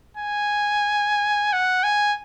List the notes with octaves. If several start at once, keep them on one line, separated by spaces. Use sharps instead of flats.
G#5
F#5
G#5